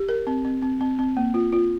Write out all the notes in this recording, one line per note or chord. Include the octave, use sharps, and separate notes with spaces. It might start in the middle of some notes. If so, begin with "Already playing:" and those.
Already playing: G4
A#4
C4
C4
C4
C4
C4
A#3
F4
F4